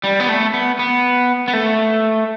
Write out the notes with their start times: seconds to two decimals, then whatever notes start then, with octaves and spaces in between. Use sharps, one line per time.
0.04 G3
0.20 B3
0.29 A3
0.54 B3
0.79 B3
1.48 B3
1.53 A3